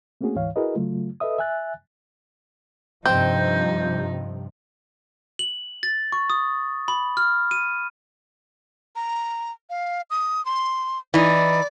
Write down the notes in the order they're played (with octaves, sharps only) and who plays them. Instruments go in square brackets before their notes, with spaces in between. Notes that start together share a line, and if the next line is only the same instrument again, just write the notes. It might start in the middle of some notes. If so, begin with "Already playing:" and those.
[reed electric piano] A3 A#3 C4 C#4 F#4 G#4
D2 G#2 E3 C#5 F5
E4 F#4 G#4 A#4 B4 D#5
C#3 F#3 A3 F4
A4 B4 D#5 E5 D#6
E5 G#5 F#6 A6
[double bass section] G2 C3 F3 [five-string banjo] C4 [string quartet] D#4 [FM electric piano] G6
[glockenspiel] F#7
A6
C#6
D#6
B5
F6
D#7
[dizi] A#5
F5
D#6
C6
[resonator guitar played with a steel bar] E3 D#4 [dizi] D5